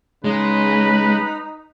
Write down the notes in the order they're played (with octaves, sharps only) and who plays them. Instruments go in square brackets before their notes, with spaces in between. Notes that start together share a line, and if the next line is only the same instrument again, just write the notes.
[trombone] C#3 [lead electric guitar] G#3 [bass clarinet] D#4 [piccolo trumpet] B4